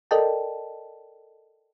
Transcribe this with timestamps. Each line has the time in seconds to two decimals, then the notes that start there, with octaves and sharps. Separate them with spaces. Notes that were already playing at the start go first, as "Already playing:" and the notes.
0.11 A4 A#4 D5 D#5 G5 A5